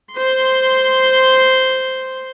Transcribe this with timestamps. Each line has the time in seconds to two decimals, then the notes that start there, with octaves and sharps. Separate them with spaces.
0.14 C5 C6